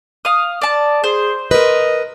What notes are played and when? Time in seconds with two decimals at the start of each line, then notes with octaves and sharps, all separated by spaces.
0.25 F5 D#6
0.61 D5 A5
1.04 G#4 C5
1.51 A#4 B4 D#5